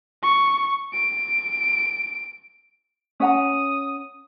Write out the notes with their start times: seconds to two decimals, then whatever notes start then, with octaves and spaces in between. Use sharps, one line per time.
0.23 C#6
0.93 D7
3.20 C#4 F#5 A#5 D#6